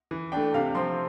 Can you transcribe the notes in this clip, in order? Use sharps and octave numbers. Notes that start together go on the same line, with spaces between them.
E3
A3 D4 G5
C3 F5
F3 C4 C6